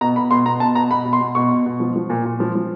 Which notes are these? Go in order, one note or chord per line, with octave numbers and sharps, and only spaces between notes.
B2 A#5
B2 B5
B2 C6
B2 A#5
B2 A5
B2 A#5
B2 B5
B2
C6
B2
B2 C#6
B2
B2
F3
F3
A#2
A#2
F3
F3